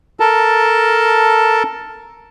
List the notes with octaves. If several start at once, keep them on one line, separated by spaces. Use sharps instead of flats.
A4 A#4 A5